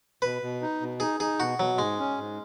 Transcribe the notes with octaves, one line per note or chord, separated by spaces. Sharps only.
B2 B4
B2
D#4
B2
D#4 G#4
D#4 G#4
B2 F#4
B2 F#3
G#2 G#3
C#4
G#2